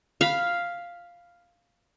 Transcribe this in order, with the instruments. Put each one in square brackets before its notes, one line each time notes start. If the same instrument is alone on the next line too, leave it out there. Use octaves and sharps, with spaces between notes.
[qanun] F5 B5